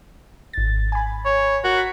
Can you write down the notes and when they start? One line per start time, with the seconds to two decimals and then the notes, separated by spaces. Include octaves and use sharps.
0.53 G#1 A6
0.92 G#5 B5
1.25 C#5
1.64 F#4 A#4
1.77 B6